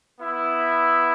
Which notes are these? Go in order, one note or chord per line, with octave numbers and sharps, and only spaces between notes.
B3 E4